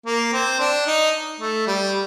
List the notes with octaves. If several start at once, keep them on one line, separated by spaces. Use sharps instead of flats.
A#3
C4
D4
D#4
A3
G3